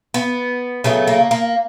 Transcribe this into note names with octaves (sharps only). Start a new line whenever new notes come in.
B3
C#3 F#3 A3 B3
A#3
A#3